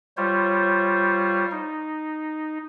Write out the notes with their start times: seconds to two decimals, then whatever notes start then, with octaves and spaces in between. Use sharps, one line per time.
0.17 G3 F4 C5 C#5
1.51 D#4